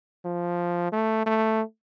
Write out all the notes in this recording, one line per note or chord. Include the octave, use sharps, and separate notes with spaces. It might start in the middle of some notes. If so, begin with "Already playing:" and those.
F3
A3
A3